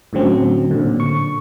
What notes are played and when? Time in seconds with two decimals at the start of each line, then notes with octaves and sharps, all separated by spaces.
0.13 A2 D3 F#3 C4 C#4
0.71 A#2 D3
1.00 C#6